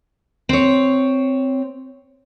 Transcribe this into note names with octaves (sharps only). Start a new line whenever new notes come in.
C4 C#5